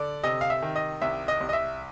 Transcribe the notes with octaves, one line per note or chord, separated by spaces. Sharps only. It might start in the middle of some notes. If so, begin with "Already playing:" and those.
Already playing: D3 D5
C3 D#5
F5
E5
D#3
D#5
C2 E5
D#5
C2
D#5
E5